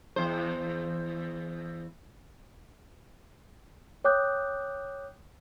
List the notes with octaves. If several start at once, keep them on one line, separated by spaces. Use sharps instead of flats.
E2 C5
C#5 G5 D6 D#6 F#6 G6